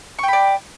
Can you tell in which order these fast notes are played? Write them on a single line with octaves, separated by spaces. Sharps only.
C#6 G5 B5 D5